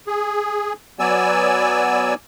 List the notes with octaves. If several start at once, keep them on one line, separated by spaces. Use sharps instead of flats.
G#4
F#3 B3 D5 G#5 E6